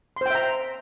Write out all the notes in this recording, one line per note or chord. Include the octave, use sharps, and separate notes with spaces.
C5 E5 G5 A#5 C6